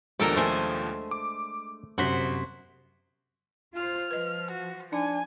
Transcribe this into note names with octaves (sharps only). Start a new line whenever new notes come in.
D#2 B2 F3 G#3 D4 G4 A4 A#4
A3 C5 G#5
D6
G1 F#2 C3 F#4 C5 B6
F4 C5 F6
F3 B4 D#5
F#4
D4 D#4 G#5